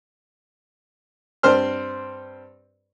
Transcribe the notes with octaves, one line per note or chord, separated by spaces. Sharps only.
G2 C4 C5 C6 F6